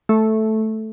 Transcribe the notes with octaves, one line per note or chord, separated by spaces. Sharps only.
A3